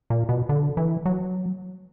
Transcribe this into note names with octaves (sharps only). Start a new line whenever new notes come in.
A#2
B2
D3
E3
F#3